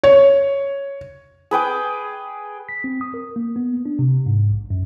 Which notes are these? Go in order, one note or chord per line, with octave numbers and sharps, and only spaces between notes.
C#5
G#4 B4 G5 D6
B6
C4
D#6
A#4
A#3
B3
D4
C3
G#2
A#1
F#2